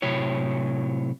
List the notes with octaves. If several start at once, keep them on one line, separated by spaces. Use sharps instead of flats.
A2 C3 F#3 E4 C#5